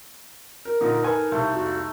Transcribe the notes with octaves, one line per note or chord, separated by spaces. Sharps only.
A#4
A#2 D3 D#4 A#4
A4 B4 G#5
C2 A3
F2 A#3 F#4